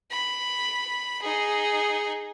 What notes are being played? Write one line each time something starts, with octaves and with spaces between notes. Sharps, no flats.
B5
D#4 G#4